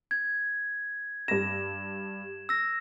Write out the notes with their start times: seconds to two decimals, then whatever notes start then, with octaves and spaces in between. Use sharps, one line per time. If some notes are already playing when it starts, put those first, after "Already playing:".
0.11 G#6
1.28 G2 A#6 E7
2.49 E6 A#6